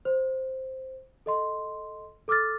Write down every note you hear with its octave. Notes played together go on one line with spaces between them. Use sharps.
C5
A4 D#5 C6
A4 D6 E6 F6 A6